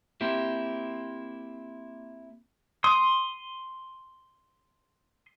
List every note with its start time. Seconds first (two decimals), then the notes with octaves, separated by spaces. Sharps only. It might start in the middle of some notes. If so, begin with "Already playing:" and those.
0.21 A#3 C4 E4 G4
2.84 C6 D#6